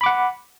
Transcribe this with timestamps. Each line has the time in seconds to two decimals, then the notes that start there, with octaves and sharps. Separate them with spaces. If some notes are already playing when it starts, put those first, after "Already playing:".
0.01 B5
0.04 D6
0.06 F#5